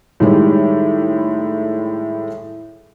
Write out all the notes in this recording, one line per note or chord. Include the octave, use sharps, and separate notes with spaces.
A2 D#3 G3 G#3 E4 G4